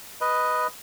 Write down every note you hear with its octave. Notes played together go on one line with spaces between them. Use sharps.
B4 D#5